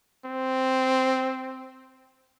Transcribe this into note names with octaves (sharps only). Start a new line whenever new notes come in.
C4